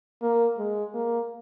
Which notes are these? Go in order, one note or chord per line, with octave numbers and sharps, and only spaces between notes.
A#3
G#3
A#3